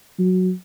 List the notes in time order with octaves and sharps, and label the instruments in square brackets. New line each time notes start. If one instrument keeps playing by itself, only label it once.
[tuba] F#3